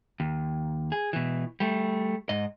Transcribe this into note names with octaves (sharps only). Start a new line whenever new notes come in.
D#2
G#4
B2 E3
G3 A3
G#2 D#5